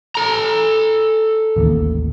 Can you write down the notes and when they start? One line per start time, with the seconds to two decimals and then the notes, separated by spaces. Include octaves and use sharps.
0.15 A4 A#5
1.56 A1 D#2